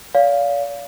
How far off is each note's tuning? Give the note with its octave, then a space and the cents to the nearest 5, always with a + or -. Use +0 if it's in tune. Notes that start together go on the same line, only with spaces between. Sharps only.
D5 -45 F5 +0